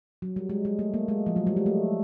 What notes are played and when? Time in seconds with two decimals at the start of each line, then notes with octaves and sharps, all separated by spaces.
0.22 F#3
0.36 G3
0.49 G#3
0.65 G#3
0.79 A3
0.94 A#3
1.08 G#3
1.26 F3
1.36 F#3
1.47 G3
1.57 G#3
1.66 A3